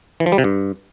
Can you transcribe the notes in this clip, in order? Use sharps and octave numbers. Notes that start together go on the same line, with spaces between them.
E3
F3
G3
C3
G2